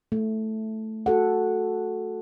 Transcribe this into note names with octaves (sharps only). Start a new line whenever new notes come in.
A3
F#4 A4 F#5